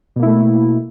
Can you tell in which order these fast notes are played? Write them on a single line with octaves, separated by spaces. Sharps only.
B2 A#3 E4 A3